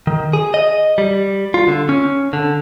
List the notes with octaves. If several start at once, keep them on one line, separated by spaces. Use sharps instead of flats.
D#3
G#4
D#5
G3
F4
D3
C#4
D3